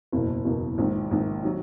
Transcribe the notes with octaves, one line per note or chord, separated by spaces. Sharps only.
F#1 E2 B2 A#3
F#1 E2 B2 A#3
A#1 G#2 D#3
A#1 G#2 D#3
D#3 F#3